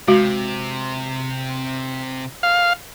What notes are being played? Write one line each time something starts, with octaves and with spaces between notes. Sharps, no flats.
C3 G#3 F#4
F5